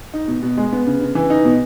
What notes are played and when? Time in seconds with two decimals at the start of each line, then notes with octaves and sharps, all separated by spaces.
0.14 D#4
0.28 B2
0.42 B2
0.58 G#3
0.73 B3
0.86 C#3
1.01 C#3
1.15 E3
1.30 D#4
1.45 B2